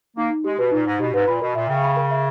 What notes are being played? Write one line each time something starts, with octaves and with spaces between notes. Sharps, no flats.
A#3 D#4
D#4
G#3 G4
B2 B4
A#2 D#4
G#2 D#4
B2 G4
G#2 B4
A#2 B5
B2 A#4
A#2 E5
C#3 G5
B5
A#4
E5